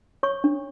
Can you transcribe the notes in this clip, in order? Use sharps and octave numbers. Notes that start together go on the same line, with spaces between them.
C#5 C#6
D4